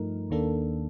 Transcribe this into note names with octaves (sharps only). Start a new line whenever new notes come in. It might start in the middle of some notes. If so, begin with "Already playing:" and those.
Already playing: G2 F3 A3 D#4 A#4
D#2 D#3 A#3 D4 A4